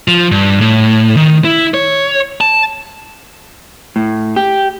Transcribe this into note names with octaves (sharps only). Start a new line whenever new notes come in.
F3
G2
A2
D#3
E4
C#5
A5
A2
G4